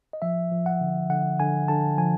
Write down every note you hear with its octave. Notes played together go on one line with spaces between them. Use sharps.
D#5
F3 E5
F3
F#5
D3
D3 F#5
D3 G#5
D3 A5
F3 G#5